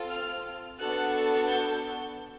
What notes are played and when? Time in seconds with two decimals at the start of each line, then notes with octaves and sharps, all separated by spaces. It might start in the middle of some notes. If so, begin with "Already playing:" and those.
Already playing: C4 F4 A4
0.09 F6
0.79 B3 D4 F#4 A4 F#6
1.48 G6